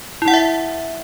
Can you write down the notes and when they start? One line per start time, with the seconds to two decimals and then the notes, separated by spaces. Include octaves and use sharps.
0.22 E4
0.28 F#5
0.34 E5